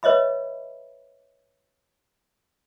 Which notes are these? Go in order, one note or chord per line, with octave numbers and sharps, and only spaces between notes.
B4 C#5 D#5 E5 B5